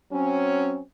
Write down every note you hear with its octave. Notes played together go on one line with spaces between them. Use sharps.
F#3 C4 C#4